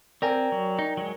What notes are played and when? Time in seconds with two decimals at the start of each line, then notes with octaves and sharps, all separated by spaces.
0.22 C4 A#4 D5 G5 G#5
0.52 F#3
0.79 D#4
0.97 F#3 G#3